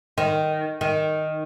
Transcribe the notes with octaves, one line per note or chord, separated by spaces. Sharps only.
D#3
D#3